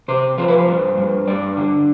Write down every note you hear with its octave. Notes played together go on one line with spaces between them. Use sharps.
C3 C5
F3 C5
B4
C5
G2
G2
G2 D5
D3